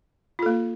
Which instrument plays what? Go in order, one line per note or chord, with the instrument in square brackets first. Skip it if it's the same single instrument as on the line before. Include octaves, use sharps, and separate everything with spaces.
[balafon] F4
A4
A#3